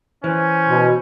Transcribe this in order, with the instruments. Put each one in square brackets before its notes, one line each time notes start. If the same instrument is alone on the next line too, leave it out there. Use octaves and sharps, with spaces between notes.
[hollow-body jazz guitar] E3 [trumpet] C#4 [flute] C5
[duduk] B2